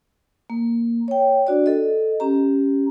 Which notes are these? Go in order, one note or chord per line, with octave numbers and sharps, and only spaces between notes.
A#3
C#5 G5
D4 F#4 D5
A4 D#5
C#4 G4 A#5